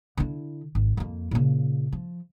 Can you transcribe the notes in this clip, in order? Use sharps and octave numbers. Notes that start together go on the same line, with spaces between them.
D3 E4
G#1
F2 A#3
A#2 C#3
F3